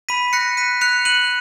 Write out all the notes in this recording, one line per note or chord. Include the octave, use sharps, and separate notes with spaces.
B5 B6 D#7
F#6 A#6 C#7
F#6 B6 D#7
F#6 C#7 F7
F#6 D#7 F#7